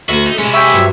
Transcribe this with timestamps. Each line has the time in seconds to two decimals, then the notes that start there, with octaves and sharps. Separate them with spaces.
0.09 D2 F#4 E5
0.26 D#4
0.38 C3 G#3 C#4 E4
0.54 G4 C5 C#5 E5
0.74 G2 F#3